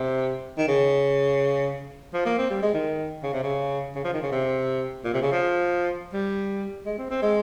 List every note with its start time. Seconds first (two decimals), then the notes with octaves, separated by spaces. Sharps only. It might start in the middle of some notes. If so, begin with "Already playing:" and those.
Already playing: C3
0.57 D#3
0.68 C#3
2.14 F3
2.26 A#3
2.38 C4
2.50 G3
2.62 G#3
2.74 D#3
3.23 C#3
3.33 C3
3.43 C#3
3.95 C#3
4.04 F3
4.13 D#3
4.22 C#3
4.32 C3
5.04 A#2
5.14 C3
5.22 C#3
5.32 F3
6.13 G3
6.86 G#3
6.98 C4
7.10 C4
7.22 G#3